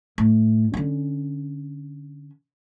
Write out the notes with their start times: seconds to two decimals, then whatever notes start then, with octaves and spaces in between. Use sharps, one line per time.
0.18 A2
0.74 D3 C#4